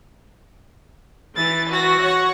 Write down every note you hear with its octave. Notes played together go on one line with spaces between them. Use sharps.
E3 A6
F#4 A#6
C#5 F#5 C#6